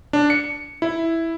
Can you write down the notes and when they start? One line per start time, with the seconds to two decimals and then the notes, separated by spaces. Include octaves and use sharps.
0.13 D4
0.30 C#7
0.82 E4